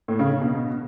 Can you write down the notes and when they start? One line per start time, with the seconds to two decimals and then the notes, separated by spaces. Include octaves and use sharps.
0.08 A2
0.19 C#3
0.30 C#3
0.41 B2